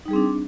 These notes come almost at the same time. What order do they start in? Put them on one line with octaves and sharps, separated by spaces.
D#4 G3 G#4 C4 D4